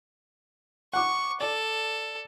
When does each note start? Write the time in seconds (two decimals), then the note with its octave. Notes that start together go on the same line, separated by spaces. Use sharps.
0.93 F#5 C#6 D6
1.41 A4 D5